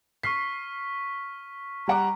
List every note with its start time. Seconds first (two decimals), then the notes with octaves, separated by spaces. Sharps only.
0.23 C#6 F6 B6 C7
1.88 G3 F#5 A#5 D6